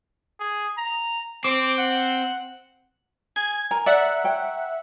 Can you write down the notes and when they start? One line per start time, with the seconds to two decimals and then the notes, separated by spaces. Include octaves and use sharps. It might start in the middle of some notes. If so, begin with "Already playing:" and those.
0.40 G#4
0.77 A#5
1.45 C4 D6
1.78 F#5
3.36 G#4 G#6
3.71 A#4 G#5
3.86 D5 E5 F#5
4.24 C#5 G5